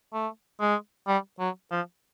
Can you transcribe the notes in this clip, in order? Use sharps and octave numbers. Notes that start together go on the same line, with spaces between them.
A3
G#3
G3
F#3
F3